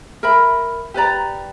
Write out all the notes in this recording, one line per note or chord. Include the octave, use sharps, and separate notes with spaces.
A#4 E5 B5
G4 B4 D5 A#5